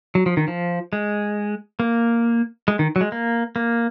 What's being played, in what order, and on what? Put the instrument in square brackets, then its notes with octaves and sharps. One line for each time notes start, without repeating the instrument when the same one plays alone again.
[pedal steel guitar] F#3
F3
D#3
F3
G#3
A#3
G#3
D#3
F#3
G#3
A#3
A#3